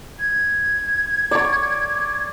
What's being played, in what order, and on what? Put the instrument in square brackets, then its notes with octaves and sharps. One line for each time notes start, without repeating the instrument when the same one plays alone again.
[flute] G#6
[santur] D5 C#6